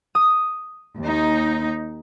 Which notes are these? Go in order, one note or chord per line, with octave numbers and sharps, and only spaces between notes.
D#6
D#2 D#4